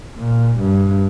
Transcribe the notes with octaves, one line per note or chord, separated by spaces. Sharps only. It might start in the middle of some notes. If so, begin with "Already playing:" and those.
A#2
G2